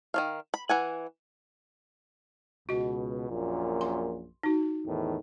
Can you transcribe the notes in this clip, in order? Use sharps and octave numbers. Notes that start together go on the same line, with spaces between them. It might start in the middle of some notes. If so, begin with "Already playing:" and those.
D#3 F#3 F5
B5
E3 F#5 G#5
C#2 B2 F#4 D#5
A#1 F#2 A#2
C6
D#4 F#4
E2 A2 D#3